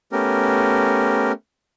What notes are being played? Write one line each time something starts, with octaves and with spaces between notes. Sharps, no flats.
A3 B3 C#4 G4 A#4